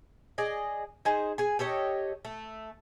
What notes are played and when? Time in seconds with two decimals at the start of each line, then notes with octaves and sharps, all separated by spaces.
0.38 G#4 D5 D#5
1.05 D#4 G#4 C5
1.38 G#4 G#5
1.59 G4 A4 C#5 D#5
2.25 A3